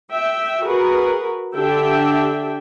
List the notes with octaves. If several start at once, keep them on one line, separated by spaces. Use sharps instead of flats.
E5 G5
F#4 G#4 A#4 B4
D3 D4 G4 E5 G5